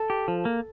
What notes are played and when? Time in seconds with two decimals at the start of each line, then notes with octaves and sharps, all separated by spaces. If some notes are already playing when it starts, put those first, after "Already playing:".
Already playing: A4
0.10 G4
0.28 F3
0.45 A#3